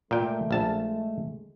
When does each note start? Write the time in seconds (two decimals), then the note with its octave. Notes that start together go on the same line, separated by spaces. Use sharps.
0.11 A#2 G#3 A3 G5
0.51 A#1 A5